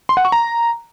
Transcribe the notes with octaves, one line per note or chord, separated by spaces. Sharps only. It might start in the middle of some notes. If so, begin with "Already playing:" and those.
C6
F#5
C#6
A#5